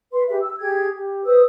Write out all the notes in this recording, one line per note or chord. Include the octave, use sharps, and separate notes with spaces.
B4 C6
G4 G#4 B4 E5
E6
G4 G#4 G5 G#6
G4
B4 C5 D#6 E6